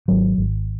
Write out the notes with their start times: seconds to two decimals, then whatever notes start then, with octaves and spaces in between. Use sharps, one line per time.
0.08 G#1 F#3
0.38 G#1